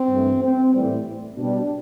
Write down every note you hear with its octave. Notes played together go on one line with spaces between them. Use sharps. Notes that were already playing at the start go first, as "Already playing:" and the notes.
Already playing: C4
G2 E3 A3
C4
A2 E3 G3
B2 G3 D4